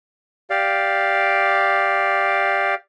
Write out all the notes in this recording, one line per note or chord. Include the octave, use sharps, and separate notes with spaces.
G4 D5 F5